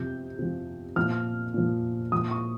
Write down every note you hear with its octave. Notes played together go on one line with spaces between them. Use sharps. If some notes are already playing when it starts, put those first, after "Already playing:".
Already playing: C3 F3 G6
C3 F3
A#2 F3 F6
A#2 F3
A#2 F3 D#6
C#6